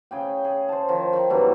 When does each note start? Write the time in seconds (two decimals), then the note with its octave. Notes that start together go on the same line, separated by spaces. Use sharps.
0.11 C#3 G#4 G5
0.44 G#4
0.69 C5 A5
0.89 D#3 F3
1.13 D#3
1.30 G2 B2 E3 F#3